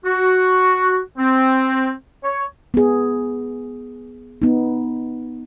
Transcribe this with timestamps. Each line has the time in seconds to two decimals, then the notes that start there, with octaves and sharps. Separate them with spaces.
0.05 F#4
1.18 C4
2.24 C#5
2.74 B3 G#4
4.42 B3 D#4